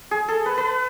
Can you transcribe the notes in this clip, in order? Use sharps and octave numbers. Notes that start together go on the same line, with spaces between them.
G#4
A4
B4
B4